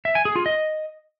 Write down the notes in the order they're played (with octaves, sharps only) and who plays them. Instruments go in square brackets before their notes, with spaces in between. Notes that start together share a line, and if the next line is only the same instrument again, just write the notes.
[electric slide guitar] E5
G#5
G#4
F4
D#5